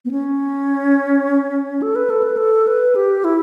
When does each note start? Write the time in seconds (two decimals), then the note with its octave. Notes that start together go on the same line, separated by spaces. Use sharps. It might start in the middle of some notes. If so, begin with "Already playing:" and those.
0.05 B3
0.11 C#4
1.82 A4
1.96 B4
2.10 A4
2.23 B4
2.37 A4
2.67 B4
2.95 G4
3.24 E4